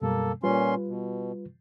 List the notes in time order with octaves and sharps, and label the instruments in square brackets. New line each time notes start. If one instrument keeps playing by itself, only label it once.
[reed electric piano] F#2 B2 G3 [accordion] A#3 A4
[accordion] A#2 C#4 C6 [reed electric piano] G3 F4 B4
[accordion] B2